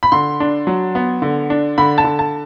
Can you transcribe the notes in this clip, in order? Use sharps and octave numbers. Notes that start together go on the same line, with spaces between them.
B5
D3 C6
D4
F#3
B3
D3
D4
D3 B5
A5
D3
A5